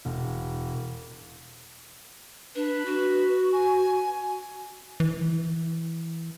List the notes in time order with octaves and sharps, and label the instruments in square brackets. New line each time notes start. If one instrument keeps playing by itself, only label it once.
[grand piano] E1
[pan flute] D4 [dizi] B4
[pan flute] F#4
[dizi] G#5
[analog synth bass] E3